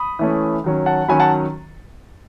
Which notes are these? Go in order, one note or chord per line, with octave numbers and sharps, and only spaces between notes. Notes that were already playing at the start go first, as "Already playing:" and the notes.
Already playing: B5 D#6
E3 A3 C#4
D#3 F#3 C#4
F#5 A5
D#3 F#3 C#4 G#5 B5
F#5 A5